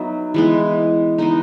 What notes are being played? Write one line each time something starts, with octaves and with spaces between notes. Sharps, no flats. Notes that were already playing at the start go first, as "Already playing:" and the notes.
Already playing: F#3 B3 D#4 E5
E3 G#3 B3
E3 B3 D#4 D#5